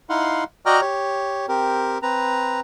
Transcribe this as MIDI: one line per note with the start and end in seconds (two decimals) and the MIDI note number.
0.10 0.44 63
0.10 0.44 64
0.10 0.44 77
0.10 0.44 78
0.10 0.44 84
0.66 0.81 66
0.66 0.81 74
0.66 0.81 75
0.66 0.81 79
0.66 0.81 82
0.66 0.81 89
0.81 1.46 67
0.81 1.46 73
1.48 1.98 60
1.48 1.98 67
1.48 1.98 70
2.02 2.60 60
2.02 2.60 71
2.02 2.60 82